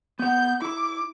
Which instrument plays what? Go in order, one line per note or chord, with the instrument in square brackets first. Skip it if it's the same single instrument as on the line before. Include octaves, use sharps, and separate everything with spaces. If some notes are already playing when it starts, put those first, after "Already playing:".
[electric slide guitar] B3 F#5 [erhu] G6
[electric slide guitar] E4 [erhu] D6